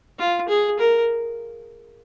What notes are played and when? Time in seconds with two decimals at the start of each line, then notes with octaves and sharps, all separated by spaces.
0.19 F4
0.48 G#4
0.79 A#4